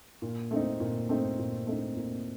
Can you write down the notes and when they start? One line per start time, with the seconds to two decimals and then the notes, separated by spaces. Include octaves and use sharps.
0.22 A#2
0.51 A3 C4 D#4
0.80 A#2
1.09 A3 C4 D#4
1.39 A#2
1.67 A3 C4 D#4
1.97 A#2